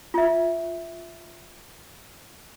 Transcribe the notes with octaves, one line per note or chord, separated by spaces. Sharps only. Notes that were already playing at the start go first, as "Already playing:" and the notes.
F4 E5